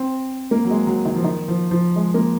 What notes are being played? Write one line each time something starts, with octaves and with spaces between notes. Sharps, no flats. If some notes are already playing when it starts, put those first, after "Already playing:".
Already playing: C4
A#3
F#3
G#3
F#3
D#3
F3
D#3
F3
F3
G#3
A#3